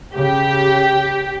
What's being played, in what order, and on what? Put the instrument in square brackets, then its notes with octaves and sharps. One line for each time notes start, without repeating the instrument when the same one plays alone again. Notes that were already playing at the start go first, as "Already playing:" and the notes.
[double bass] C#3 [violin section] G4